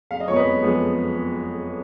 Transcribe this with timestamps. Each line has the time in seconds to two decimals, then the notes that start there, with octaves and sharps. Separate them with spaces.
0.11 F#1 F5
0.20 D#5
0.28 F2 F3 G#3 B3 C#5
0.36 B4 D#5
0.44 F#1
0.61 F2 F3 G#3 B3